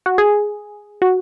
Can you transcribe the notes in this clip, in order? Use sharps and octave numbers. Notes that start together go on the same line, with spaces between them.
F#4
G#4
F#4